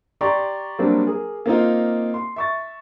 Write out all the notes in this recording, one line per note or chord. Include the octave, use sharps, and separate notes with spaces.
G4 D5 A#5 C6 C#6
F#3 G3 A#3 C4 D4
G#4 A#4
A#3 C4 D#4 F4
C6
E5 C#6 A6